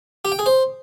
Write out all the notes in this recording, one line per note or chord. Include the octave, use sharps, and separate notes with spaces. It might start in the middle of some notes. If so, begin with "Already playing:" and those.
G4
G5
G#4
C5